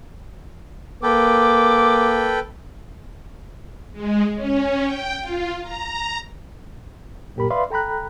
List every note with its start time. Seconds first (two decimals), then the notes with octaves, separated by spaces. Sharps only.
1.03 A#3 A4 B4 G5 D6
3.92 G#3
4.35 C#4
4.82 G5
5.21 F4
5.62 A#5
7.36 F#2 A#2 G4 A#4 B5
7.50 B4 D5 E5 F5 B5 C6
7.70 A4 G5 A#5 B5 F#6